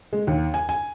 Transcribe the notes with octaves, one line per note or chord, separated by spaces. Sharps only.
G#3
D#2
G#5
G#5